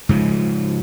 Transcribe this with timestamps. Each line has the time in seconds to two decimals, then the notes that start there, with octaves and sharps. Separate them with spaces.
0.09 G#2 C#3 F3